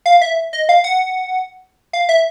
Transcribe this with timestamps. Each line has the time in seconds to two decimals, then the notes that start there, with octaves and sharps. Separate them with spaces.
0.06 F5
0.21 E5
0.53 D#5
0.69 F5
0.84 F#5
1.93 F5
2.09 E5